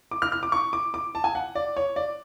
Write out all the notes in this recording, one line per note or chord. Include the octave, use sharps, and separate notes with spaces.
D6
F6
F6
D6
C#6
D6
D6
A5
G#5
F#5
D5
C#5
D5